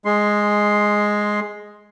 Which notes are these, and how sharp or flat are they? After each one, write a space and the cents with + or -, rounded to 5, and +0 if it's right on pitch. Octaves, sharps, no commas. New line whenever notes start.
G#3 +0 C6 +0